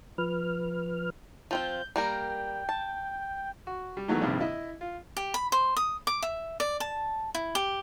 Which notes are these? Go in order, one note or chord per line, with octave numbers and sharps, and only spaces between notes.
F3 B4 F6
F3 C4 F4 G6
G3 A#3 A#4 G5
A5
F#4
G3
D#3 E3 F#3 G#3 A3 B3
A#1 G2 C3 D#3
E4 D#5 E5
F4
G4
B5
C5
D#6
D6
E5
D5
A5
E4
G4